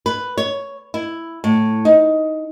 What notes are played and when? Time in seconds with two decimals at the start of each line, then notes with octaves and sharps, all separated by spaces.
0.06 B4
0.38 C#5
0.94 E4
1.44 A2
1.85 D#4